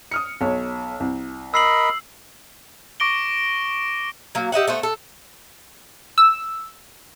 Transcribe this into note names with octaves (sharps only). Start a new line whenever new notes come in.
D#6 F6 C#7
B1 C#5
C2
A#4 D#5 B5 E6 C7 F#7
C#6 D6 A#6 D7 G7
F#3 A#3
G4 D#5 E5 F#5
A3 B3 C5
A4
E6